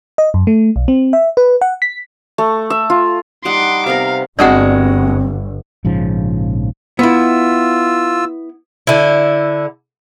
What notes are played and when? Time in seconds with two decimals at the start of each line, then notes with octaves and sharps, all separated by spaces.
0.18 D#5
0.34 F#2
0.47 A3
0.76 B1
0.88 C4
1.13 E5
1.37 B4
1.61 F#5
1.82 B6
2.38 A3
2.70 E5
2.90 F4
3.45 G3 D#4 F#5 C6 D6
3.86 C3 B3 A#4 F5
4.39 G1 G2 G#3 C4 F#4 D5 F#5
5.85 A#1 G#2 C#3 F3
6.99 B3 E4 F4 E6
8.87 D3 E4